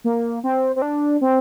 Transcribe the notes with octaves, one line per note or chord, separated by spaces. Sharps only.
A#3
C4
C4
D4
C4